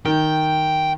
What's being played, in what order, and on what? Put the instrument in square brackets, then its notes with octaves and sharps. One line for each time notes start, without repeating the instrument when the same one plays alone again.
[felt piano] D#3 [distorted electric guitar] G5